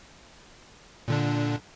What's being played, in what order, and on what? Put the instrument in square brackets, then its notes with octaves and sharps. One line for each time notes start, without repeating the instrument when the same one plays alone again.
[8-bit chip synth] A#2 D3 D4